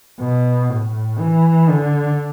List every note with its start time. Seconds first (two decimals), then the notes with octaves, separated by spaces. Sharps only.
0.21 B2
0.70 A2
1.19 E3
1.69 D3